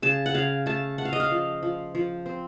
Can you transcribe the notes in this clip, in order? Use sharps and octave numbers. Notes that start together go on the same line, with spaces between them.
C#3 A5
F#5
C#3 F5
A3 A5
A3 F#5
F5
D#5
F5
F3
F3
F3
C4